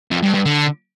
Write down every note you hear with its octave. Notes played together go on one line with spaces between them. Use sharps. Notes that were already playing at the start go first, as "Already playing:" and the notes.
F2
G2
G2
D3